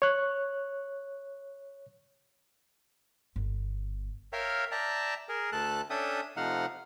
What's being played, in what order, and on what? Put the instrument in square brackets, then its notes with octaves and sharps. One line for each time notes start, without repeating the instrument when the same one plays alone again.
[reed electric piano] C#5 F#6
[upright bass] G1
[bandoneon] A#4 C#5 E5 F5 G5
D5 E5 G5 A5 A#5
G#4 A#4
D2 A3 A4 A5 F#6
C#4 D4 A4 E5 G5 D#6
C3 F3 A3 D#4 F5 F#5